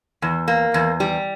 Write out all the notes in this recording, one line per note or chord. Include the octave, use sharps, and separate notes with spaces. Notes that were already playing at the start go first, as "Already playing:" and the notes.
E2
A#3
E2
G3